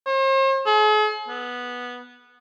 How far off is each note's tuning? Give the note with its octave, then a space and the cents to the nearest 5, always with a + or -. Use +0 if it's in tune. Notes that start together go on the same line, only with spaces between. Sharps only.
C5 +45
G#4 +45
B3 -10